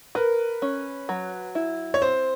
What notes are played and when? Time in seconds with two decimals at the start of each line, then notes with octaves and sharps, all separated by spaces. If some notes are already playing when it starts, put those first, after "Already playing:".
0.15 A#4 B4
0.62 C#4
1.09 F#3
1.55 E4
1.94 C#5
2.02 C4 C5